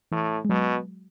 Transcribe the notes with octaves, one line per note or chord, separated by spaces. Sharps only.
A2 E3
G#3
B2 F#3